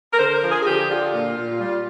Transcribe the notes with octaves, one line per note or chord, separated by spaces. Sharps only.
A#4
D3 C5
A#4
F3
G#4
G#4
D3 G4
D3 F4
A#2
A#2
G3